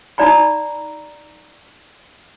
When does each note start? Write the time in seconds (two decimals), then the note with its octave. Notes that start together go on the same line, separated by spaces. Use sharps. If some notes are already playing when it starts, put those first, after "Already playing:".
0.18 D#4 D5 A#5 B5